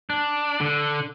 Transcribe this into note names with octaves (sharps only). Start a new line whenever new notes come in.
D4
D3